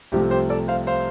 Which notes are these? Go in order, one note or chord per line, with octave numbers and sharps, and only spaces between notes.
C2 C3 F3 A3 G4
G4 C5
A4 D5
C5 F5
C5 F5